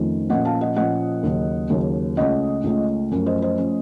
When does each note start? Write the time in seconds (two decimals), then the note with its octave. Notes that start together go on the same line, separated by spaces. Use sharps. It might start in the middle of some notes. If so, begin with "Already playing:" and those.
Already playing: F2 D#3 A3 C#4
0.30 A#2 F3 A#3 C#4 D#5 F#5
0.45 F5 A5
0.61 D#5 F#5
0.76 A#2 F3 A#3 C#4 D#5 F#5
1.23 D#2 C#3 F#3
1.70 D#2 C#3 F#3
2.17 C#2 C#3 A3 C#4 D#5 F#5
2.64 C#2 C#3 A3 C#4
3.11 F#2 F3 A3 C#4
3.26 C5 D#5
3.42 C5 D#5
3.58 F3 A3 C#4